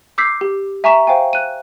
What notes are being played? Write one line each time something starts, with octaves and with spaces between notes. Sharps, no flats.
D6 E6 G6 B6 C7
G4
E5 G#5 A#5 C#6 B6 E7
C5 F5 G5 G#5
F#6 D#7